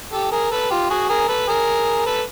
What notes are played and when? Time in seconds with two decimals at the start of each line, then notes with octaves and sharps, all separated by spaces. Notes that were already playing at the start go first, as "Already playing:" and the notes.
0.12 G4 A4
0.32 G#4 A#4
0.51 A4 B4
0.70 F4 G4
0.90 F#4 G#4
1.09 G#4 A#4
1.28 A4 B4
1.48 G#4 A#4
2.06 A4 B4